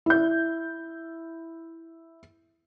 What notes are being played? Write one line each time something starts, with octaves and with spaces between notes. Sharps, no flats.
E4 G6